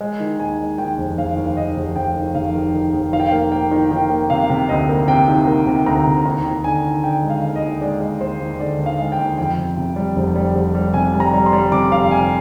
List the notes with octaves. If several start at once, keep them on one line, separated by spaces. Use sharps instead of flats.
G#3
D#3
D#2 G#5
G#3
D#2 G5
F1
F1 F5
D#2
F5
D#2 D#5
F1
F1 G5
D#3
F1 F5
D#3
D#3
F1
D#3 F5
G5
A#3 F5
A#3 G5
D#3
D#3 G5
A#3
C3 F5
C3
D2 D#5
A#3
C3 G5
D#3
A#3
C3
D2 A#5
C3
D#2 A#5
D#2
D3 G#5
D#2
D3 G5
G#3
F5
D#2
D#5
D#2
G#3 D5
G#3
D#2 C5
D#2
D3 D5
D#2
F5
G#3
G5
D#2
F2 G5
C3
C3
G3
F1
G3
F1
G3
C3 G#5
G3
A#5
G3
C6
G3
C3 D6
F1 F5
C3 G#5